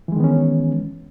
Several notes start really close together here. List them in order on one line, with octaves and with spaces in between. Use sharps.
E3 G#3 D#3 B3 C#4